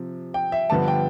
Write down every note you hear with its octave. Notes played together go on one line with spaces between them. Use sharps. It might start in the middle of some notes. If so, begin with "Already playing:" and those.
Already playing: C3 F3
G5
E5
G2 D3 F3 B3 A5
G5